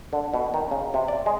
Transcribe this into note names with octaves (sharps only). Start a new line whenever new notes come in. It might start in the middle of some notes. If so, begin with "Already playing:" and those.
D3
B2
D#3
C#3
C3
D5
G#3